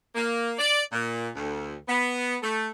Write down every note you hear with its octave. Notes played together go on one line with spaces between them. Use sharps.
A#3
D5
A#2
D2
B3
A3